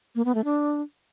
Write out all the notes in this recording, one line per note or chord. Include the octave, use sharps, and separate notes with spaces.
A#3
B3
A3
D4